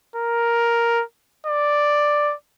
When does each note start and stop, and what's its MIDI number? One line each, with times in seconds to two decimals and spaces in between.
0.16 1.03 70
1.47 2.34 74